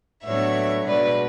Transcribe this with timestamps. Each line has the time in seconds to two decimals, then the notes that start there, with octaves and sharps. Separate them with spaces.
0.25 A2 F#3 B3 D4 C#5 E5
0.87 B2 G#3 D4 B4 D5